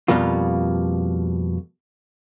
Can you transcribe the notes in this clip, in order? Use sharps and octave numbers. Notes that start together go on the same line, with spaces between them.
F2 B2 G3 A#3 F4